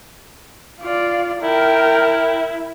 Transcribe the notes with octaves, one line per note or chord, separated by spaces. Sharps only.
F4 D5
E4 A#4 G5